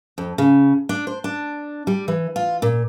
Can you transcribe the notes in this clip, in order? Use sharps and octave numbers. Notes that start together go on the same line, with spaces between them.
F2
C#3
D4
C5
D4
G3
E3
F4
A#2